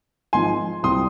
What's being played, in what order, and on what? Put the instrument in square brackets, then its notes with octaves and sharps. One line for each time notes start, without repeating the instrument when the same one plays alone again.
[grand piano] G#1 G#2 F3 G#5 C6
C2 A#2 G3 C4 C6 D#6